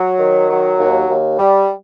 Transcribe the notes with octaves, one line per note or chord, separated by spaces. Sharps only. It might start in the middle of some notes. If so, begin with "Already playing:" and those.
Already playing: F#3
D#3
F#3
D#2
D#2
G3